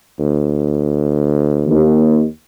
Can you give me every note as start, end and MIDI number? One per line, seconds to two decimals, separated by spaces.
0.19 1.89 38
1.67 2.24 39